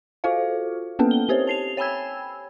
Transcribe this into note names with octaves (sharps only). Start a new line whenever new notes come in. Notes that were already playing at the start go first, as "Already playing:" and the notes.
F4 F#4 A4 C5 F5
A#3 B3 C#4 A4 B4
G7
C4 G4 C5 C#5
A5 C7 F7
C#5 G5 G#5 B5 E6 G#6